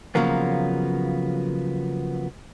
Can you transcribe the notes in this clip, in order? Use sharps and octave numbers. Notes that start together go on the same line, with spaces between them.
C#3 F3 F#3 A#3 B3